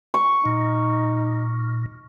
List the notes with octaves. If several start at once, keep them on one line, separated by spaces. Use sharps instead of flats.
C#6
A#2 D#4